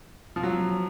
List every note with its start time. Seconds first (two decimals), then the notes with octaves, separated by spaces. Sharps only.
0.36 F3
0.43 F#3